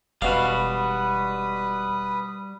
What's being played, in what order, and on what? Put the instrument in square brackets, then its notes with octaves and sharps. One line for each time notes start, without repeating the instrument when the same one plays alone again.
[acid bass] E1 [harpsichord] B2 F5 [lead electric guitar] G3 F#4 [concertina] B4 D#6